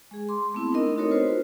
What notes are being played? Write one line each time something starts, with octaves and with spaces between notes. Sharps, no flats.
G#3 G#4
C6 D6
A3 B3 C4 E4
D4 D#4 A#4 D#5
C4 D#4 F#4 A4 A#4 C#5
F4 B4 C5